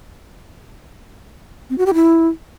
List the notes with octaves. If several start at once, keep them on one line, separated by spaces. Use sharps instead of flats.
C4
F#4
G4
E4